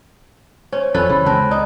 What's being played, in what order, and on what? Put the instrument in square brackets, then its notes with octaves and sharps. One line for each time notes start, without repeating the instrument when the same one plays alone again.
[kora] C#4 [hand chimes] C5
[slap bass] F2 [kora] C#4 A4 B4 [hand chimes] D5
[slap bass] C#3 E3 [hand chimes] B5
[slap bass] C#2 [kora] C4 [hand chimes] A5 F#6 A#6
[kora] D#4 [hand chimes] D5